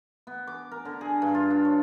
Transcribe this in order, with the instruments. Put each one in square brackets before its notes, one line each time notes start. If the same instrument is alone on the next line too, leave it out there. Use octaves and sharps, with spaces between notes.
[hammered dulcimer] B3
D6
A#4
D3
G#4
G2
F4
D4
C#5